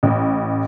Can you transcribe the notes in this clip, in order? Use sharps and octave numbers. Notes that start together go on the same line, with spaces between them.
A1